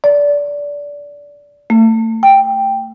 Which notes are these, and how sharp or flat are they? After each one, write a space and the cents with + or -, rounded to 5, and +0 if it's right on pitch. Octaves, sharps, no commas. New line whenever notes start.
D5 -20
A3 +35
G5 +5